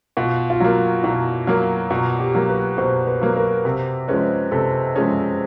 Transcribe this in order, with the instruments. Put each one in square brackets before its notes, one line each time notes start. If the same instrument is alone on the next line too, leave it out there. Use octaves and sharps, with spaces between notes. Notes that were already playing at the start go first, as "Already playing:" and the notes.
[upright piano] B2 [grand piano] F4
[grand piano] F4
[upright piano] F#3 A#3 [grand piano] F#4
[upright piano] B2 [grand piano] E4
[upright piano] F#3 A#3
[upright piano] B2 [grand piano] F4
[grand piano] G4
[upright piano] F#3 A#3
[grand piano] B4
[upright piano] B2 [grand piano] C5
[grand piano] B4
[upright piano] F#3 A#3
[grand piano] A#4
[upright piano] C3
[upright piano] F3 G#3 C#4 [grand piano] B4
[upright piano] C3 [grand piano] A4
[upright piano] F3 G#3 C#4 [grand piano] G#4